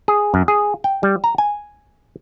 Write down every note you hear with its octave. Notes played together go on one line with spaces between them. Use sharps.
G#4
F#2
G#4
G5
G3
A#5
G#5